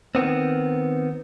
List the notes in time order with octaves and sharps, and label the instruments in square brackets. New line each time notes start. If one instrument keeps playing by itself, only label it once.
[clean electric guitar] D#3 B3 C4